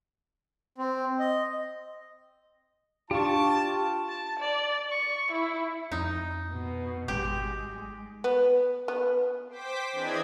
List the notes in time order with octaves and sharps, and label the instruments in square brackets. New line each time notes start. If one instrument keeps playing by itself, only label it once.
[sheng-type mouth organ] C4
D#5
[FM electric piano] D4 [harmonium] F4 [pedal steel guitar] G4 C#6 [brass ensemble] A5
[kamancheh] A5
D5
C#6
E4
[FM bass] F2 [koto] D#4
[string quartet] B2
[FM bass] G#1 [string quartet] G#3 [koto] G4
[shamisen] B3
B3
[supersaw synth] C5 G5 D6 B6
E3 C4 D4 G#4 D#5 G#6